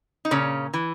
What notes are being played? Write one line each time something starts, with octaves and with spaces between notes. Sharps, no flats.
D#4
A#2 C#3 C#4
E3